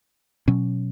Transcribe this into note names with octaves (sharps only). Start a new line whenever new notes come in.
B2 F#3 C#4